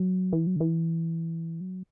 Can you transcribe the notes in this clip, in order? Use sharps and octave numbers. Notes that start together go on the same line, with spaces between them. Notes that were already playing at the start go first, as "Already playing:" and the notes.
Already playing: F#3
E3
F#3
D3
E3
F#3